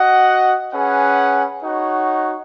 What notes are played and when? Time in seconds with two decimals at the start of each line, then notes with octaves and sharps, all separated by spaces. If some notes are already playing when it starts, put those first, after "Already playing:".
Already playing: F#4 D#5 F#5
0.72 C#4 G#4 B4 F#5
1.62 D#4 F#4 C#5 F#5